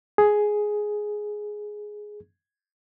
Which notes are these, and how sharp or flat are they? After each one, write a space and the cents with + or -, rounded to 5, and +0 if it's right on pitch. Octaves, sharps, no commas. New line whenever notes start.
G#4 +5